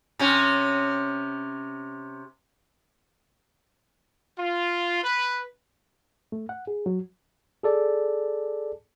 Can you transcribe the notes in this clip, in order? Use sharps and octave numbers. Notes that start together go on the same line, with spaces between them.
C3 C#4
F4
B4
A3
F#5
G#4
F#3
G#4 A4 D5